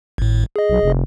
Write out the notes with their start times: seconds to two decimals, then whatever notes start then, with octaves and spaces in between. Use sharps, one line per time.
0.18 G#1 A2
0.56 G#4 D#5
0.70 B1
0.83 F1